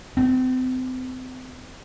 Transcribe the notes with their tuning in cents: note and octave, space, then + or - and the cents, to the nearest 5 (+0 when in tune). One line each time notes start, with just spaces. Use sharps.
C4 -35